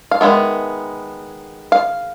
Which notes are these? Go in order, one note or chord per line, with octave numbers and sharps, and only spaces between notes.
F5
D#3 G#3 B3 E5
F5